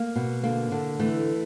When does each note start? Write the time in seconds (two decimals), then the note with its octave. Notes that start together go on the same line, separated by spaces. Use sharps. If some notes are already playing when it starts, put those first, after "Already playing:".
Already playing: A#3
0.16 B2
0.43 D3 A#3
0.72 D3
0.99 E3 A3